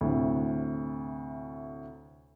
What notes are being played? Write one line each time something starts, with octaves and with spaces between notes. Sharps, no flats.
D2 A2 C3